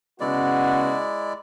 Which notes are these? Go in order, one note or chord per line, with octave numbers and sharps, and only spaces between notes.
C#3 G#3 B3 E4 F#4 D5